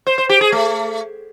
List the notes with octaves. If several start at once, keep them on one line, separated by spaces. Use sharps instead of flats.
C5
C5
G4
G#4
A3